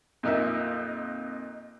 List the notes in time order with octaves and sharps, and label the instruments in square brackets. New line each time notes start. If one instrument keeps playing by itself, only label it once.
[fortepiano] F2 A#2 D#4 A#4 E5